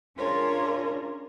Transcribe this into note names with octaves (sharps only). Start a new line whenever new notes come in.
C#4 D4 F4 G#4 A#4 C#5